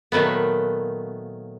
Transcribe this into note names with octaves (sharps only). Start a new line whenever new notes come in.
A#2 D#3 F#3 A3 B3